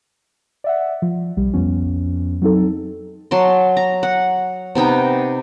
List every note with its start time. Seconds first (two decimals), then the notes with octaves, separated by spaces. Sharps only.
0.64 D5 E5 F#5
1.02 F3
1.37 B1 G3
1.53 F2 F3 B3 C#4
2.42 F#3 C4 D#4 A4
3.31 F#3 A5 C6
3.77 A#5
4.03 F#5
4.75 C3 B3 D#4 G5